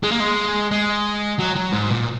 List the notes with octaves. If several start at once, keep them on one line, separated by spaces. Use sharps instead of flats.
G#3
A#3
G#3
G#3
F#3
F#3
G#2
A#2